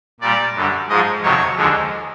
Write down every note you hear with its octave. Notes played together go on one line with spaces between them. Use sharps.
A#2 G3 D5
F#2 D3 G3
G#2 F3 G#3 D#5
F2 C3 D#3 F#3 C#5
D#2 D3 F3 G#3